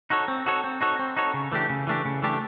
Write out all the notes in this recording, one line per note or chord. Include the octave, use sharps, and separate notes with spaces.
D#4 F#4 A4 C#5
C4
D#4 F#4 A4 C#5
C4
D#4 F#4 A4 C#5
C4
D#4 F#4 A4 C#5
C#3
E3 A3 D4 G4
C#3
E3 A3 D4 G4
C#3
E3 A3 D4 G4